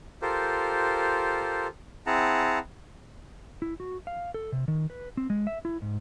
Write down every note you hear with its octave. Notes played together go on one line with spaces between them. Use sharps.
F4 G4 A4 A#4 C5
C4 E4 G#4 F#5 A5 A#5
E4
F#4
F5
A4
C3
D#3
B4
C4
G#3
E5
E4
G#2